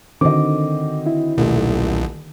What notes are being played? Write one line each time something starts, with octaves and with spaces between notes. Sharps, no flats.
D3 D#3 C4 F#4 D#5 D6
E4
D#1 B1 A3